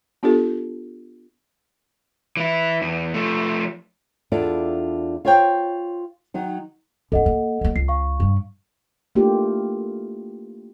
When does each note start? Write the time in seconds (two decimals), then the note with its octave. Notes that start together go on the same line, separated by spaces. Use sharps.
0.23 B3 D4 F4 G4 A4
2.37 E3 E4
2.82 E2
3.14 F3 A3
4.32 E2 D4 E4 F4 A4 D5
5.25 F4 C5 C#5 F5 G5
6.34 D#3 F#3 D#4
7.12 G2 A#3 A4 D#5 F#5
7.26 A#3
7.61 F#3 A#3
7.76 C#2 C7
7.88 F5 C#6
8.20 G2 G3
9.15 A3 A#3 D4 E4 F4 G4